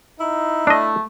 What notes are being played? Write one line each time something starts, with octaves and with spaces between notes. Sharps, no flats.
D#4 E4
A3 D4 D#5